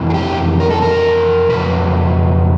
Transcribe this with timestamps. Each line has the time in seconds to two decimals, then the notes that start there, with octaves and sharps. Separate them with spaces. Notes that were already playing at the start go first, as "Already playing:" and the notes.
Already playing: F2 C3 E3
0.10 G#4
0.14 G4
0.60 A#4
0.70 A4
0.82 A#4
1.49 F2 C#3 F#3 B4